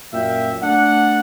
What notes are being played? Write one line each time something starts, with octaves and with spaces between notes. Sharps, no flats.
F#2 A#2 F#3 E5 F5 G5
A3 D4 F#5